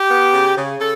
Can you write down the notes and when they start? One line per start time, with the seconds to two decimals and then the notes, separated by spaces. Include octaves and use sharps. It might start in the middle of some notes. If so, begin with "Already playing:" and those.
Already playing: G4
0.10 B3
0.33 C#3
0.57 C#3
0.80 C#3 A4